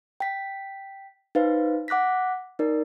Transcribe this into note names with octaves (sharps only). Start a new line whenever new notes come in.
G5 B6
D#4 B4 C5 F5
F#5 D6 F#6 A#6 B6
D#4 A#4 D5